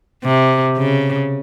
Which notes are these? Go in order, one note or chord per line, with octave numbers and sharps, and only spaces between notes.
C3
C#3